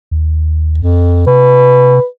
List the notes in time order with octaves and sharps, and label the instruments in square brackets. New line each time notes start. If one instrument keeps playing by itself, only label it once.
[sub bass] D#2
[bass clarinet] F2
[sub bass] C3 [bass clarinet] B4